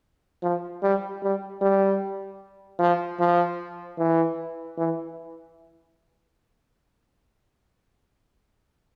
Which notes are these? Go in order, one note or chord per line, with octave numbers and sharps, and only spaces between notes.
F3
G3
G3
G3
F3
F3
E3
E3